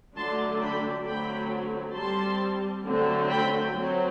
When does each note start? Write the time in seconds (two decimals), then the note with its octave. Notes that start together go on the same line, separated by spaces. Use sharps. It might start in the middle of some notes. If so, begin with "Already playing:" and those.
0.16 D3 F#3 A3 D4 A5 C6
0.60 G5 B5
1.05 D3 F#3 A3 C4 G5 B5
1.95 G3 C4 A5 C6
2.85 D3 F#3 A3 C4
3.29 G5 B5
3.75 F#3 C4